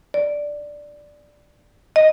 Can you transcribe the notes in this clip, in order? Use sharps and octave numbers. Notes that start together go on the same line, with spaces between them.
D5
D#5